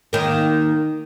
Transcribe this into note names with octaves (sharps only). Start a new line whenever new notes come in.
D#3 A#3